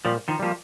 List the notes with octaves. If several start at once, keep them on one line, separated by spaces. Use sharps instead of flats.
A#2 F3 G3
D#3 F3
F3 G3 A#3